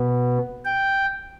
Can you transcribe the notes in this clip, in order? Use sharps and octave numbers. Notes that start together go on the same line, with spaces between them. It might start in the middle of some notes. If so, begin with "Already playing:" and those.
Already playing: B2 B3
G5